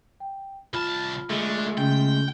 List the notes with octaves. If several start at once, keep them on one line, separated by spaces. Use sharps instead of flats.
G5
C2 F4 A5 B5 F6
D3 G#3 A3
C#3 G5